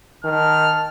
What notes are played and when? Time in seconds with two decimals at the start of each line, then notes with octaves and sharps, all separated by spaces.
0.24 D#3 A5 F6